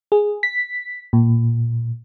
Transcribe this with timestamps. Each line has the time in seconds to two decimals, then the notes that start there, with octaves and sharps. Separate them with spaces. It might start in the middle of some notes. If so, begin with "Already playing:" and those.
0.12 G#4
0.43 B6
1.13 A#2